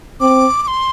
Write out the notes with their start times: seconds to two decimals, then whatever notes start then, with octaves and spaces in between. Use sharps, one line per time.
0.20 C4 D6
0.63 D6
0.68 C6